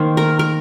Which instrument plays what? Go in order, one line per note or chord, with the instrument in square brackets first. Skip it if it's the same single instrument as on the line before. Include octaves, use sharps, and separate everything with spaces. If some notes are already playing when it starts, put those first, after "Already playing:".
Already playing: [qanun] D#3 A#3 C5
A#4
A#4